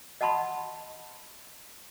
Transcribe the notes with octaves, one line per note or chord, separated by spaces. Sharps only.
D#5 F#5 A5 B5 C6